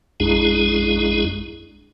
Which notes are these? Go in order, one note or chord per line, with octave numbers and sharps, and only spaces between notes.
A#1 F#2 G#3 D4 E4 G#4